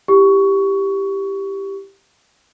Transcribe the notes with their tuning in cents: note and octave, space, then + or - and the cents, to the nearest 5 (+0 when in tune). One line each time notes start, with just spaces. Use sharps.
E4 +0 G4 +0 C#6 +15